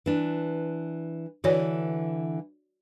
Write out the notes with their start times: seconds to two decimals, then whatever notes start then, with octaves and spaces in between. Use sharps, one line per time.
0.06 E3 D4
1.44 D3 E3 F#4 C#5 D5